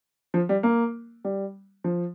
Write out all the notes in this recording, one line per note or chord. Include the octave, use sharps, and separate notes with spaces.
F3
G3
A#3
G3
F3